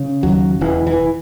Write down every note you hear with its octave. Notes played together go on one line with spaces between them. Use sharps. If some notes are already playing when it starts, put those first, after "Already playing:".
Already playing: C#3
D#2 F#3
E1 E3
E3